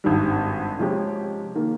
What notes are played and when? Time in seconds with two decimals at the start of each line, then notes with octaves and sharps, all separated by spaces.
0.04 G#1 G2 D#3 G3
0.79 C3 F3 G#3 C#4 G4
1.55 D#3 A#3